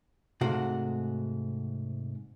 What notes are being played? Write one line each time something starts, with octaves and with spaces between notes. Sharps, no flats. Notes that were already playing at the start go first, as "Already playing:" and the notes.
G#2 C3 A3 F#4 F5